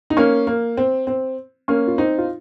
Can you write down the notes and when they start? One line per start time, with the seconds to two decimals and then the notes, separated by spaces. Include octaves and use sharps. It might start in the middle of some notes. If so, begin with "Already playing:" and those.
0.10 D#4
0.17 A#3 C#4
0.47 A#3
0.77 C4
1.07 C4
1.68 A#3 C#4
1.87 F4
1.98 C4 D#4
2.18 F4